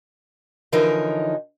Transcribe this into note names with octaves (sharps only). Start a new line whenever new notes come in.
D3 E3 F3 C#4 D#4 A#4